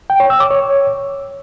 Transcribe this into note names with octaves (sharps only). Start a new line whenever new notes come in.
G5
C#5
E6
D6
C#5